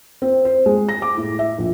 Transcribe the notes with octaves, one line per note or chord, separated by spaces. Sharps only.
C4
C5
G#3
A#6
D6
A2
E5
A#1